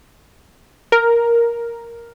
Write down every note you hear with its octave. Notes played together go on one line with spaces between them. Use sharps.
A#4